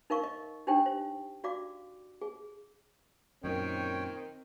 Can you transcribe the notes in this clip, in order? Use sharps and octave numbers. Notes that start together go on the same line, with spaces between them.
D#4 A#4 F5 C#6
D#5
D4 D#4 G4 C5 G5
C5
F#4 D5 F5 D6
G#4
F#2 A#2 D#3 C4 C#5 G5